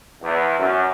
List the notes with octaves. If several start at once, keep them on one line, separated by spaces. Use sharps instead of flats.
E2
F#2